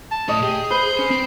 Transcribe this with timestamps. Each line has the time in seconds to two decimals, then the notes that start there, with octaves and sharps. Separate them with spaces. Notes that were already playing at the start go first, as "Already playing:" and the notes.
0.12 A5
0.29 A2 C#5 D#5
0.43 G4 G#4
0.71 B4 C5
0.99 C#4
1.11 C4